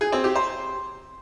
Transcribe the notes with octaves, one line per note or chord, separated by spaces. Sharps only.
G#4
C4
G4
C5